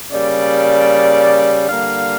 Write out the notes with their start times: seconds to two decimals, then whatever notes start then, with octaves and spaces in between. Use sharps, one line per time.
0.11 C#3 G3 A#3 D5
1.67 D3 G3 A#3 F5